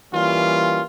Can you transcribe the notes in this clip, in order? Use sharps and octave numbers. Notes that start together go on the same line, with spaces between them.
E3 G3 A#3 C#4 F4